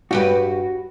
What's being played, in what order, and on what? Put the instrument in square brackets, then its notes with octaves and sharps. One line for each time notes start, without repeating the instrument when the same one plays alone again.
[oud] G2 G4 B4 [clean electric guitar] F#4